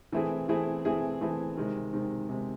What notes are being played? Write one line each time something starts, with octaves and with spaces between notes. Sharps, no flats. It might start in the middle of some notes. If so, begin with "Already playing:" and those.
E3 A3 C4 E4 G#4
E3 A3 C4 E4 G#4
E3 A3 C4 E4 G#4
E3 A3 C4 E4 G#4
C3 D#3 G#3 C4
C3 D#3 G#3 C4
C3 D#3 G#3 C4